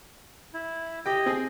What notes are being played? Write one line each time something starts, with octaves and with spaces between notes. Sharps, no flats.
E4
G4 D#5 G5
C4 G#4